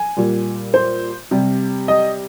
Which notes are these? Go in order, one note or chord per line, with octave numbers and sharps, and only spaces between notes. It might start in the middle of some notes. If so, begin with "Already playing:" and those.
Already playing: G#5
A#2 G3
C5
C3 G3
D#5